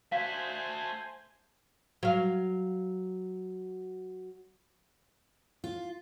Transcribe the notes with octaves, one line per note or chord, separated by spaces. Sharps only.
A3 F#4 C5 F5 G#5
F#3 F5
F4